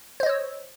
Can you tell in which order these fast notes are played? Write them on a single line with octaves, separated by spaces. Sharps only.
C5 D#5 C#5 E6